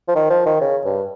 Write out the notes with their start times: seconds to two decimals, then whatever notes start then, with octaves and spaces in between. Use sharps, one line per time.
0.08 F3
0.15 D#3
0.30 F3
0.46 D#3
0.61 C#3
0.85 G2